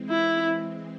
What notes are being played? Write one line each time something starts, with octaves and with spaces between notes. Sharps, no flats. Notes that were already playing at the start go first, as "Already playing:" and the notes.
Already playing: E3 G#3 C4
E4